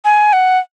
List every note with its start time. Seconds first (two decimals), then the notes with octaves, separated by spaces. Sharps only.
0.05 G#5
0.33 F#5